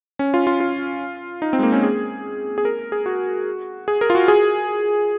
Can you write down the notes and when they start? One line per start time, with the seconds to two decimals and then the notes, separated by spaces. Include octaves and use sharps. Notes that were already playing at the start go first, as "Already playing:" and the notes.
0.19 C#4
0.34 F4
0.47 F4
0.60 F4
1.42 D#4
1.53 C4
1.59 G#3
1.63 A#3
1.72 C#4
1.83 G#4
2.58 G#4
2.65 A#4
2.92 G#4
3.06 F#4
3.88 G#4
4.01 A#4
4.10 F4
4.15 F#4
4.28 G#4